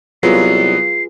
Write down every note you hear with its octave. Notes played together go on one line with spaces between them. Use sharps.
C2 F#3 B3 F4 G#4 B4 C7